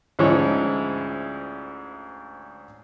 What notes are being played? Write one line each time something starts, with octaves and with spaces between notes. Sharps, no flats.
D2 G#2 F3 C#4 E4 C#5